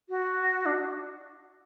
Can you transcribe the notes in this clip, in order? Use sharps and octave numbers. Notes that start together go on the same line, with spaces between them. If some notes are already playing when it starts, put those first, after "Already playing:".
F#4
D4